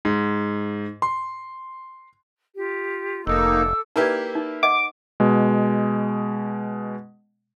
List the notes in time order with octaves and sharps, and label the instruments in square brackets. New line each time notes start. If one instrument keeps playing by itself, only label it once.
[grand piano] G#2
C6
[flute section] F4 G4
[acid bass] F1 [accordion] A#3 D#4 [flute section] A4 D6 [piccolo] E6
[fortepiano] A#3 E4 G4 [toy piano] D#4 B4 D5
[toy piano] D#4
[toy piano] D#5 F#5 [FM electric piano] D6
[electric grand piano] B2 G#3